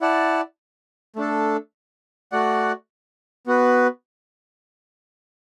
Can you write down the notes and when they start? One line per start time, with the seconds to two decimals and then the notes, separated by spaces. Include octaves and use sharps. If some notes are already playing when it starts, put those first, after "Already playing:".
0.01 E4 D5 F#5 A5
1.16 A3 D4 A4
2.32 A3 F#4 D5 F#5
3.47 B3 F#4 B4